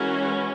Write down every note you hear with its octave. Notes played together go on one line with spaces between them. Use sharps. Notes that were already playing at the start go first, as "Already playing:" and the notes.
Already playing: E3 G#3 C#4 F#4 A#4